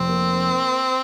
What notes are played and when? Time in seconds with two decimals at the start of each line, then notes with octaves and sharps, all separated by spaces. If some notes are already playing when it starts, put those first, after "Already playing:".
Already playing: F1 C4
0.08 A#3